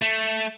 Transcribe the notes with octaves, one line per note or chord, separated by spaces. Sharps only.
A3